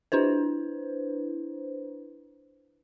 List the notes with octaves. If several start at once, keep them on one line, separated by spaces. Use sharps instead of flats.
D4 E4 B4 C5